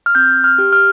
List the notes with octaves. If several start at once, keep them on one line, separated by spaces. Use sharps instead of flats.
F6
C4 G6
F6
G4
F6